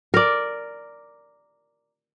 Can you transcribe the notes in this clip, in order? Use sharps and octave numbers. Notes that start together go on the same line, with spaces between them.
A#4 D5